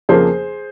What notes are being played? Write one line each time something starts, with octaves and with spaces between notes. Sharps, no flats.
F2 C#3 F3 A#3 G#4 C5